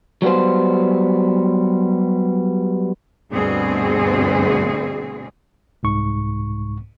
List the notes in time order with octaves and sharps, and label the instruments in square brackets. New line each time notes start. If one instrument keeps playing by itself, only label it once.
[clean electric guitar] F#3 G3 B3 C5
[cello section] D2 G2 B2 C4 G#4
[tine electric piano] C2 G#2 C#6